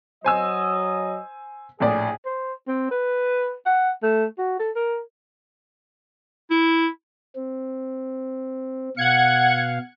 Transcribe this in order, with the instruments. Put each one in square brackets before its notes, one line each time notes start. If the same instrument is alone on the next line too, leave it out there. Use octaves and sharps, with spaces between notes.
[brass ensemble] F#3 D#5 [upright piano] C5 G#5 E6
[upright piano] A#1 A2 D5 [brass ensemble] G#4
[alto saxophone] C5
C4
B4
F#5
A3
F#4
A4
A#4
[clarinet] E4
[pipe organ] C4
[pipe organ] B2 F5 [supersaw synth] F#5 G#6 C#7